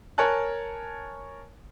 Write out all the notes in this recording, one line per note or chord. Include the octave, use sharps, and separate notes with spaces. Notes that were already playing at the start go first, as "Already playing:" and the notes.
A#4 C#5 G#5 A5 F#6